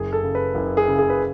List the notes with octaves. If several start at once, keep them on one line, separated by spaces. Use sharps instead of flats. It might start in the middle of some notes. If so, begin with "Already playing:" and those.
Already playing: F#1 G#4
A4
C#3
B4
F#1
G#4
C#3
G#4
B4